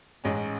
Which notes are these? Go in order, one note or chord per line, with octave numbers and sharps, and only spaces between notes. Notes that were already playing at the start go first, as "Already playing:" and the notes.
A1 G#2 G#3 C#4